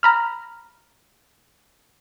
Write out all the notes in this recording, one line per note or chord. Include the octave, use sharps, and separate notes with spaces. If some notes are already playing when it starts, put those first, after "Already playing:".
A#5 B5 F6